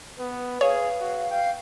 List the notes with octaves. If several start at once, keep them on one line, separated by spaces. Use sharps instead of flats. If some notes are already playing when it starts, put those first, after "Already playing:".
B3 B4
G#4 C#5 F5
F#4
F5 G5